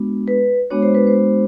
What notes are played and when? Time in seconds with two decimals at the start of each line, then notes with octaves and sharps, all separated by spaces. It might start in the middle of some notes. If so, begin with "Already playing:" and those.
Already playing: G#3 B3 D4 F#4
0.28 B4
0.70 G#3 B3 D4 F#4 C#5
0.83 C5
0.95 B4
1.07 C5